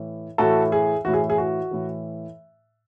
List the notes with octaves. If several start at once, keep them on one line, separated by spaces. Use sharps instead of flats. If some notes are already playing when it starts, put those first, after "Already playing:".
Already playing: A2 E3
A2 E3 F#4 A4
G#4
A2 E3 F#4
G#4
G#4
F#4
A2 E3